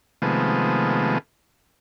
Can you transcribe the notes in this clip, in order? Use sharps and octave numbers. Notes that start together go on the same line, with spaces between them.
C3 D#3 F3 G#3 A3 B3